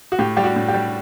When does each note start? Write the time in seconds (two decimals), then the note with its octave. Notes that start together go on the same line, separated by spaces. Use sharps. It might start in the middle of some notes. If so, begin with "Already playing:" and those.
0.12 F#4
0.19 A2 G4
0.37 G3 G4
0.44 F#4
0.56 A2
0.68 G4
0.74 G3